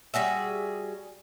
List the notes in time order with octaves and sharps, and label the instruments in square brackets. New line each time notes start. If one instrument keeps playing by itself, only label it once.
[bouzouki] G3 F#4 G#4 E5